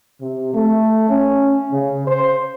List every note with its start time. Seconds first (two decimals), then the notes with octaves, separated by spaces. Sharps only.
0.21 C3
0.54 A3
1.09 C#4
1.72 C#3
2.08 C5